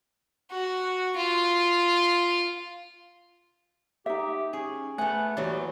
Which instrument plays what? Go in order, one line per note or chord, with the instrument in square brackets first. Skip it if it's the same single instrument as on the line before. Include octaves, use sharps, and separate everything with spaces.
[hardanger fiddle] F#4
F4
[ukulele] D#4 E5 [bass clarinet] G4
[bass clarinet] C#4 [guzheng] G#4
[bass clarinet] A3 [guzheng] B3 F#5 [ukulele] G#5
[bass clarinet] D#2 [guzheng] E3 F#3 [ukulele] D5